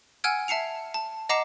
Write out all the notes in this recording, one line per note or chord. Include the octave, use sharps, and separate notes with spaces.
F#5 G#5 E6 F6 G#6 D7
E5 A5 C7 C#7 F7
A5
D#5 F#5 A#5 D6 C7 E7